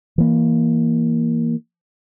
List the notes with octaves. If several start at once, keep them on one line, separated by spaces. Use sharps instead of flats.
E3 A#3